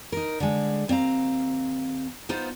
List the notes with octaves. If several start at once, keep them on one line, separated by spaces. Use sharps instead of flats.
D#4 A#4
D3 G#3
D#2 C4 D#5 F5 A#5
B3 D#4 F4 C5